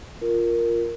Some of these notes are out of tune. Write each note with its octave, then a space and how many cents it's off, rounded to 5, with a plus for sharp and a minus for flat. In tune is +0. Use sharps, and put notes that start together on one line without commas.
F4 +0 A#4 +0